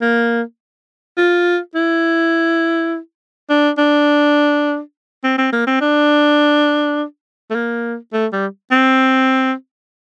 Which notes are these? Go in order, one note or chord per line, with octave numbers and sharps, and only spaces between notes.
A#3
F4
E4
D4
D4
C4
C4
A#3
C4
D4
A3
A#3
A3
G3
C4